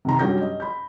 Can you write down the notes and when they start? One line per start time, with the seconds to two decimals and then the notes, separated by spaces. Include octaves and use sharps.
0.05 C3 D#3 A#5
0.19 G2 F#3 C#4 G4 G6 A#6
0.41 D#5
0.60 B5 G6